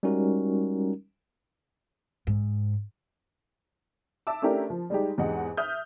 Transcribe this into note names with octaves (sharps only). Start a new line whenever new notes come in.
G3 G#3 C#4 D#4 F#4 A#4
G#2
E5 A5 D6 E6
A3 C#4 D4 E4 G4 A#4
F3
G3 G#3 D#4 G4
E2 G#2 G4 D#5 F#5
E5 D#6 F6 G6